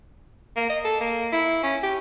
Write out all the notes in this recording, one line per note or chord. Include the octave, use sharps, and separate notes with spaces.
A#3
D#5
A4
A#3
E4
C#4
G4